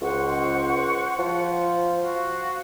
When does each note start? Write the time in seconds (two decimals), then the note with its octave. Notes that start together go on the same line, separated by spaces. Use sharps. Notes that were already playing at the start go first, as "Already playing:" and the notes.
0.01 C#2 C5 F#5 C#6
1.19 F3
2.00 F#4 F5